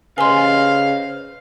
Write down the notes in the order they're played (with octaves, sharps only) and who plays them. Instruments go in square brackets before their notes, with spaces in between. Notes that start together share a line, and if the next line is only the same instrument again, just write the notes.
[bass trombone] C#3 [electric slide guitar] B4 C5 D#5 [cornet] F5 [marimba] G#5 C6